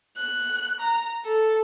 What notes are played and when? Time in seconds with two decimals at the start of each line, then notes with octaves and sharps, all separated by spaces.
0.17 F#6
0.80 A#5
1.24 A4